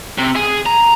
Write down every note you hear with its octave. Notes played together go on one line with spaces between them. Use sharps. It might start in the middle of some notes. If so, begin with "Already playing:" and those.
C3
G#4
A#5